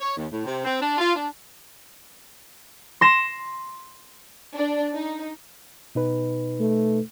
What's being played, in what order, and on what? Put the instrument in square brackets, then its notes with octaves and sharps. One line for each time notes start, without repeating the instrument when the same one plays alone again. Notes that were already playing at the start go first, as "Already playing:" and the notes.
[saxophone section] C#5
D#2
A2
C3
C4
D4
F4
D4
[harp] C6 A#6 E7
[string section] D4
D#4
[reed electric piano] B2 D#4 B4
[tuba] A3